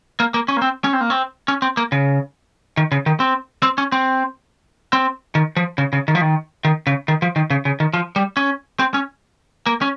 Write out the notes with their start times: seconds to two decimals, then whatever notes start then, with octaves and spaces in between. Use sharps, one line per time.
0.20 A#3
0.34 A#3
0.48 C#4
0.57 A#3
0.62 C4
0.84 C#4
0.93 C4
1.01 A#3
1.10 C4
1.48 C#4
1.62 C4
1.77 A#3
1.92 C#3
2.77 D#3
2.92 C#3
3.06 D#3
3.20 C4
3.63 C4
3.78 C#4
3.92 C4
4.93 C4
5.35 D#3
5.57 F3
5.78 C#3
5.93 C#3
6.08 D#3
6.15 F3
6.21 D#3
6.65 D#3
6.87 C#3
7.08 D#3
7.22 F3
7.36 D#3
7.50 C#3
7.65 C#3
7.80 D#3
7.94 F3
8.16 G3
8.37 C#4
8.79 C4
8.94 C#4
9.67 A#3
9.82 C#4